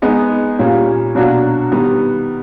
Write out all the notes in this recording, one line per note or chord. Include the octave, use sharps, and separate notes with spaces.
G#3 B3 D#4 G#4
A#2 G3 A#3 C#4
B2 F#3 A#3 D4 F#4
D#3 G3 B3